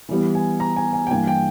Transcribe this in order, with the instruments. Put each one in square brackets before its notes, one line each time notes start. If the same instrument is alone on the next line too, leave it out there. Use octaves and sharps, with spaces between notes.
[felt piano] E3 G3 B3
[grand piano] G#5
A#5
G#5
G#5
G5
[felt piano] G2 E3 A#3 [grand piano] G#5
[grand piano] G5